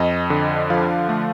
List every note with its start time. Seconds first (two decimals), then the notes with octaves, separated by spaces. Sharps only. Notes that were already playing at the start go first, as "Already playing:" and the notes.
Already playing: F2 D#5
0.30 D3
0.70 F3 F5
1.09 A3